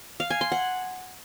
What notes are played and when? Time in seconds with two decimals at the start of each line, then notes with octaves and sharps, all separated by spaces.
0.20 F5
0.30 G#5
0.41 C6
0.52 F#5